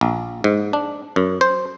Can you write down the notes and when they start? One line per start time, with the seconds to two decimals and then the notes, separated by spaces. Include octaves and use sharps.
0.01 A#1
0.44 G#2
0.73 D4
1.16 F#2
1.41 C5